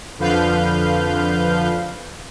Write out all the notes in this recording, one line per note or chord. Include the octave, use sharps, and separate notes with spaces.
F2 D3 F3 B4 F5 G6